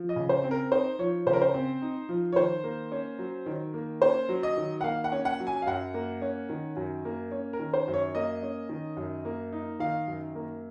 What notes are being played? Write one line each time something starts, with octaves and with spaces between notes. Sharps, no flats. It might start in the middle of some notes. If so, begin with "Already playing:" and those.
Already playing: F3
D#5
C#3
C5
C4
A#4
D#4 C5
F3 C#5
C#3 C5
A#4
C5
C4
D#4
F3
C#5
D#3 C5
A#3
C#4
F#3
D#3
A#3
C#4 C5
F#3
D#5
D#3
F#5
A#3 F5
F#5
C#4
F#5
F#3
G#5
F5
F#2 F#5
A#3
C#4
D#3
F#2
A#3
C#4
A#4
D#3
C5
F#2
C#5
A#3 D#5
C#4
D#3
F#2
A#3
D#4
D#3 F5
F#2
A#3